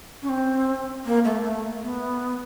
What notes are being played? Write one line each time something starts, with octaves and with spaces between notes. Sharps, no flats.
C#4
C4
A#3
A3
A3
B3